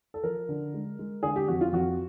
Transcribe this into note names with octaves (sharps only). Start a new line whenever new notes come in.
A4
F3 A#4
D3
G#3
G#3
D3 G#4
G4
F2 F#4
F4
F2 F#4